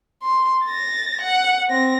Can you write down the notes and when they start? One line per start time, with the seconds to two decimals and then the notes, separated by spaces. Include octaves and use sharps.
0.23 C6
0.65 A6 A#6
1.21 F#5
1.69 C4 A#6